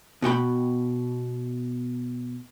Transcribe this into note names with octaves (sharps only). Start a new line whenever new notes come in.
B2 F#4 G5 B5